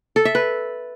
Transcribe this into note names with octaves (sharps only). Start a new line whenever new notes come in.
A4
E5
B4